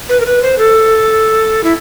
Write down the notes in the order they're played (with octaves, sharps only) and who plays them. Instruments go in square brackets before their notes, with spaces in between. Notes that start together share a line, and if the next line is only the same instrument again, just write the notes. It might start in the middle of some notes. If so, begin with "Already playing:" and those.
[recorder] B4
A#4
B4
C5
A4
E4